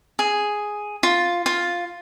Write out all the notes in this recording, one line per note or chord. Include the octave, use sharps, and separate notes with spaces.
G#4
F4
F4